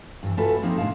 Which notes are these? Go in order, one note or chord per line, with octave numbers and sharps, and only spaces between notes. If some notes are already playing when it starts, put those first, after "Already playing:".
G2 E3
A3 C#4 F4 F#4 A4 B4
F3 A#3 C4 D#4
A2 D3 G#3 A#3 F5 A5